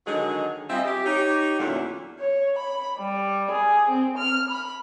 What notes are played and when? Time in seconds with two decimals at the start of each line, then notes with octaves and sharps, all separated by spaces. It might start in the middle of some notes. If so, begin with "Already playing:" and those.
0.06 D3 D#3 F#3 G#3 D#4 G#4
0.69 G3 C4 F4 G#4 D#5 E5
0.85 G4
1.05 D#4 G4 C#5
1.59 E2 A#2 D3 F#3 C#4 E4
2.19 C#5
2.58 B5
2.99 G3
3.52 G#4
3.90 C4
4.19 F6
4.50 B5